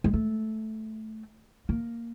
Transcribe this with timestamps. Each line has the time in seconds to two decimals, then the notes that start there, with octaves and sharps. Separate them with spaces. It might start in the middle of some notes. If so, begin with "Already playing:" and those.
0.04 G#3
0.14 A3
1.69 A#3